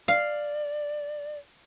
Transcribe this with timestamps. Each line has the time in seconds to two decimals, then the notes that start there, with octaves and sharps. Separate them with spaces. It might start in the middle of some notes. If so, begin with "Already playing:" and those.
0.08 D5 F5